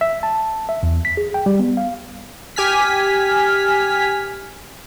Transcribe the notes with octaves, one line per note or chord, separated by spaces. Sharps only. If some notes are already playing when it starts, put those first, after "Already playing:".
E5
A5
E5
E2
B6
G#4
G5
G3
B3
F5
G4 G#5 F6 B6